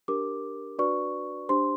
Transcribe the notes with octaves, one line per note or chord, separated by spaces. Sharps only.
D4 G4 A#4 D6
D4 F#4 B4 D5 C#6
D4 G4 C5 C6